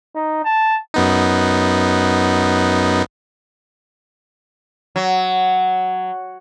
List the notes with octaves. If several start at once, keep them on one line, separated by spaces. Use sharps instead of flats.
D#4
A5
F#2 B3 D#4
F#3